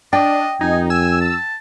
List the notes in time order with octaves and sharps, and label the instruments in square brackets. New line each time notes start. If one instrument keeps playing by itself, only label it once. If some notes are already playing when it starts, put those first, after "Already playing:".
[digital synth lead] D4 [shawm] D#5 [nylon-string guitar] G5
[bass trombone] F2 [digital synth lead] D#4 [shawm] G#5
[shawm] G#5 [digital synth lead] E6
[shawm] A5